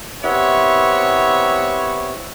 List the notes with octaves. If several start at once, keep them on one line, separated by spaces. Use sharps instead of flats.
C3 B3 E4 C#5